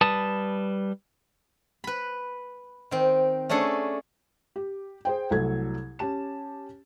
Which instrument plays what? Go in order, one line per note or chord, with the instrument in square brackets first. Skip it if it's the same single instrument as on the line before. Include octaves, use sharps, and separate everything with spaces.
[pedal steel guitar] G3 B4 A5 D#6
[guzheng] B4 B5
D#3 C4
A3 C#4 D4 G#4 A4
[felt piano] G4
G#4 C5 G5
C2 F#3 A3 A4 G#6
C#4 G4 A5 E7